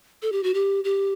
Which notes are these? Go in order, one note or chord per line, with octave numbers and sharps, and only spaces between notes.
A4
G4
F#4
G4
G4